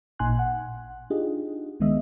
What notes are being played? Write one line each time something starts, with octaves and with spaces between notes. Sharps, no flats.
A1 A#2 D#4 G#5 C6 F#6
F#5
D4 D#4 F4 G4 G#4 D#5
C#2 D#3 G#3 B3 D#5 E5